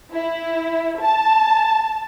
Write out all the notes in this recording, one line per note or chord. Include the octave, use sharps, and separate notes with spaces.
E4
A5